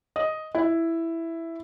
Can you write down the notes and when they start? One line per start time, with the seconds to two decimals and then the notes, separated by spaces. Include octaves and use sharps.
0.16 D#5
0.55 E4